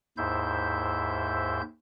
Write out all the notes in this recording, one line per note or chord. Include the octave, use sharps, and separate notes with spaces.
D#2 G#2 E4 C5 E5 G6